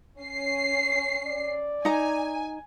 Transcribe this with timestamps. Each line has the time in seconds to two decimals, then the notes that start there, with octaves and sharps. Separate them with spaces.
0.19 C#4 C7
1.26 D5
1.85 D#4 G#5 A#5